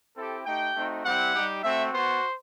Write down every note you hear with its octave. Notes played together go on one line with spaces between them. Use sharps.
C4 E4 G4 A4
A3 D#4 G4 G5
A3 C4 D#4 F#4
G3 C4 E4 G4 F#5
G3 D#4 G4
A3 C4 F#4 E5
B3 F#4 C5